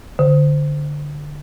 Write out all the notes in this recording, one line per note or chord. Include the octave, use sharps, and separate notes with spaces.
D3